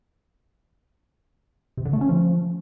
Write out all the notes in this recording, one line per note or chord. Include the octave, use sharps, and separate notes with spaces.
C3
D3
A3
C#4
F3